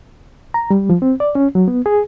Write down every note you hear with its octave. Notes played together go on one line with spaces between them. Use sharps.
A#5
G3
F3
C4
D5
C#4
F#3
B3
G#4